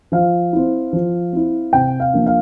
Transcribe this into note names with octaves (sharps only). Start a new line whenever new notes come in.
F3 F5
C4 E4
F3
C4 E4
C3 G5
F5
F3 A#3 D4
F5